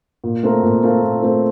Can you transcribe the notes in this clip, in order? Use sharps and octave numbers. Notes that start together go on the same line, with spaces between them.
A#2
A3 C4 F4 A#4
A#2
A3 C4 F4 A#4
A#2
A3 C4 F4 A#4